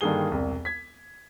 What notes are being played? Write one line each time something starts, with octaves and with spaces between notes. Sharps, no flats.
G2 D3 D#3 A#3 G#4 G7
E1 C2
G#6 B6